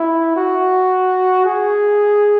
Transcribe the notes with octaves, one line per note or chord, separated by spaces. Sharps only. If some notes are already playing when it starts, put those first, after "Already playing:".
Already playing: E4
F#4
G#4